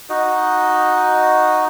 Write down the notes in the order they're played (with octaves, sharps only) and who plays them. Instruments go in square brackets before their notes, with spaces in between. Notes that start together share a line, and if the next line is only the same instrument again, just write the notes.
[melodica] D#4 F#4 D#5